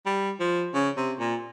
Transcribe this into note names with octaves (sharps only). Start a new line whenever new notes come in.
G3
F3
C#3
C3
A#2